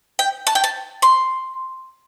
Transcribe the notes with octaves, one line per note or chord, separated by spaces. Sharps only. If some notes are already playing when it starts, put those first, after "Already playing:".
G5
A5
G5
A5
C6